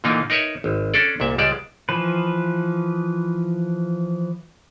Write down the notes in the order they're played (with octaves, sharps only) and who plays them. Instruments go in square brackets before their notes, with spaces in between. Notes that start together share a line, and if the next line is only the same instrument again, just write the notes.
[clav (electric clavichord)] A#2 D3 E3 A#3 D#4 F4
D#4 A#4 B4 C#5 E5
G#1
C#4 D4 A4 D5
C2 A#2 E5
C#2 G3 G#3 D5 A5
[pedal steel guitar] E3 F3 B4